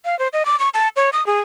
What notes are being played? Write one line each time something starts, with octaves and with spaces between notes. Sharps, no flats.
F5
C5
D#5
D6
C#6
A5
C#5
D#6
G#4